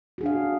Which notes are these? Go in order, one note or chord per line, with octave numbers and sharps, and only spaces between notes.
D4 F#4 G#4 F5